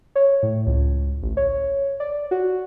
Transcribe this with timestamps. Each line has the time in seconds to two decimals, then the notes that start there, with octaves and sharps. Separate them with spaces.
0.16 C#5
0.43 A2
0.67 C#2
1.22 A1
1.37 C#5
2.00 D5
2.31 F#4